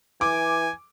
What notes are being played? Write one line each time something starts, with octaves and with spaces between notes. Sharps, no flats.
E3 G#5 D6